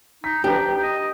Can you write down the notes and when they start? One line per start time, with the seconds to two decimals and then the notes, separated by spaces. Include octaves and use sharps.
0.24 D#4 B6
0.44 F3 D4 G4 B4 A#5
0.57 G5 A#5
0.83 D#5